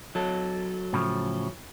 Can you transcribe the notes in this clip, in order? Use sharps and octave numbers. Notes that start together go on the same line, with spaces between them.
F#3 A4
A2 C#3 F3